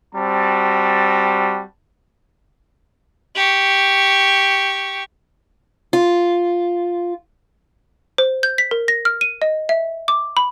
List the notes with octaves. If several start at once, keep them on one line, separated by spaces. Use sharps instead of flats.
G3 C4 F#4 A5
G4 C#6
F4
C5
G6
B6
A#4
A#6
F6
D#7
D#5
E5
D6
B5